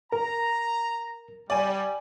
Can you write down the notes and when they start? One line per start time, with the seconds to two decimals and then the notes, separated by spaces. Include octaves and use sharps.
0.12 A#4 A#5
1.50 G3 D5 G#5